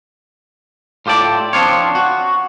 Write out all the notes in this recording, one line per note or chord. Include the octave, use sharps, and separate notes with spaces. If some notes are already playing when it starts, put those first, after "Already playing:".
A2 F4 G4 A4 D5
F3 C4 D4 F4 C#5
F#4